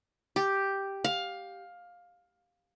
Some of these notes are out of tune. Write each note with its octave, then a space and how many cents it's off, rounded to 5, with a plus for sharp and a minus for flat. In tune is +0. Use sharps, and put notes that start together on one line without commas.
G4 +0
F5 +15